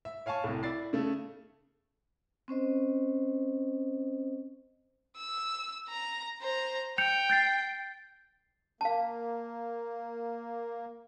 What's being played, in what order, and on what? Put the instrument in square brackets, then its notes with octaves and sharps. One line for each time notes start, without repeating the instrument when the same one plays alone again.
[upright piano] E5
C#5 F5 G#5 A5 C#6
C2 A2
E4 D5 A6 C7
C#3 A3 A4
[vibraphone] C4 C#4 C5 D#5
[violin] E6
A#5
C5 A#5
[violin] G5 [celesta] G6 C#7 F7
[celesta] G6 A6 C7
[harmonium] A#3 [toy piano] F5 A5